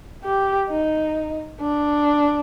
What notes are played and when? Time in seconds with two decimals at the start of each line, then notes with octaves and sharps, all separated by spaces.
0.24 G4
0.70 D#4
1.60 D4